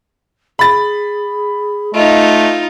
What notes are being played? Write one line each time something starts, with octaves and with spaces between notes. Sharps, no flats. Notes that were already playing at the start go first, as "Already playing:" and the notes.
G#4 B5 A6
A3 D#4 F4 D#5